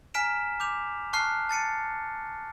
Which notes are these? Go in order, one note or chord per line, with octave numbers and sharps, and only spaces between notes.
G#5 A#5 F6 B6 D7 E7
D6 G6 F7
A5 C#6 F6 F#6 C7
A5 A6 C#7 D#7